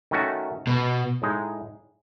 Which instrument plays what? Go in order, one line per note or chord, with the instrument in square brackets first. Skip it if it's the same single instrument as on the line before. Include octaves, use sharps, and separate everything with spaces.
[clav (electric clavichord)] D#3 A3 C#4 F#4
[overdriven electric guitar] B2
[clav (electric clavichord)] A2 G#3 D#4 G#4